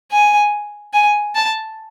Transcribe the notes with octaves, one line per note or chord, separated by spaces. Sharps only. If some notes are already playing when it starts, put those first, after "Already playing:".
G#5
G#5
A5